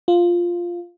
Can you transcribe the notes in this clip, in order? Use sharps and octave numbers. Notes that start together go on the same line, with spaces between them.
F4